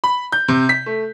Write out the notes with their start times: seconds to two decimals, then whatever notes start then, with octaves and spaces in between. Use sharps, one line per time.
0.04 B5
0.32 G6
0.48 C3
0.69 B6
0.86 A3